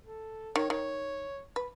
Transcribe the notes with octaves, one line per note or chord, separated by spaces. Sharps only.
A4
D#3 C#5
D#3 C#5
B4